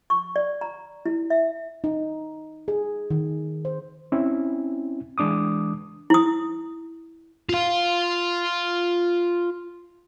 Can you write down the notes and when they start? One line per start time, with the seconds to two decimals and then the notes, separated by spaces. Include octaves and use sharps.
0.10 C#6
0.36 D5
0.61 A#5
1.06 E4
1.30 E5
1.84 D#4
2.68 G#4
3.10 D#3
3.65 C5
4.12 C4 C#4 E4
5.18 E3 G#3 D4 D6 D#6
6.10 E4 D#6
7.49 F4 F5